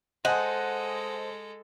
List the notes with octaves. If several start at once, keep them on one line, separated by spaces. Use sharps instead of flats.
G#3 A4 C5 D#5 F#5 G#5 A5